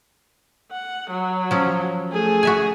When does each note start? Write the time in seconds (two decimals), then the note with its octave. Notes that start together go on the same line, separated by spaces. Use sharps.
0.72 F#5
1.10 F#3
1.51 F3 C#4
2.11 A3 G#4
2.43 F#4 E5 G#5